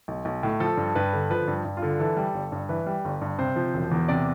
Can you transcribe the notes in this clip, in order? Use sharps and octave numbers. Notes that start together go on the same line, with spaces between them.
B1
B1
A2
F3 A4
G2
G2 B4
D3
F3 B4
G2
G2
F4
D3
E3 A4
G3
G1
G2
E3 B4
G3
G1
G2
C3 C5
F3
E1
E2
C3 D5